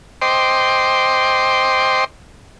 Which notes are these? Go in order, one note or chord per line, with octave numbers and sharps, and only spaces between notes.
C5 D#5 G5 C6 D6